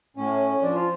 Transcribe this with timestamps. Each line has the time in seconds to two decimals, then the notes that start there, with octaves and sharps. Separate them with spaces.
0.17 A2 C#4
0.61 F3 D4
0.75 F4